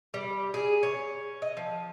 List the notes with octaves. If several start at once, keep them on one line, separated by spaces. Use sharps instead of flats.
G3
G#4
C#4
D#5
F3